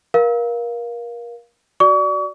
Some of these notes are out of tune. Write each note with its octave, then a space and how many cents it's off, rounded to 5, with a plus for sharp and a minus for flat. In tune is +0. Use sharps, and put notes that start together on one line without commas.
A#4 +30 F5 +0
F#4 +15 D5 +0 C#6 +40